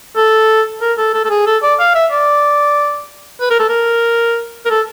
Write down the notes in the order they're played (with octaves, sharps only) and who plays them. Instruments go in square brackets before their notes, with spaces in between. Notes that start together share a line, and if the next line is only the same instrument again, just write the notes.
[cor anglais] A4
A#4
A4
A4
A4
G#4
A4
D5
F5
E5
D5
B4
A#4
A4
A#4
A#4
A4